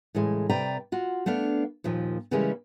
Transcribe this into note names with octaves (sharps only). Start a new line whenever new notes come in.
A2 C#3 E3 G#3
C3 B4 D5 G5 A#5
F4 F#4
A3 B3 D4 F5
D#2 A#2 F3
C#3 E3 G3 G#3 A#3 C#4